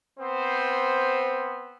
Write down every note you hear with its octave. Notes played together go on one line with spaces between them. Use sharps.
B3 C4 C5